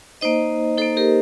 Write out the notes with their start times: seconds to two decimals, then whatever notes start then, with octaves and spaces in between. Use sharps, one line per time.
0.21 A#3 D#4 C5 D#5
0.78 A#3 D#4 A4 C5
0.97 G4 A#4